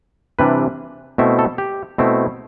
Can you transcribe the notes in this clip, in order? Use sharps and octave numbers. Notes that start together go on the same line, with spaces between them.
C3 E3 G3 D4 B4
B2 A3 C4 E4 E5
A4
G4
B2 A3 C4 E4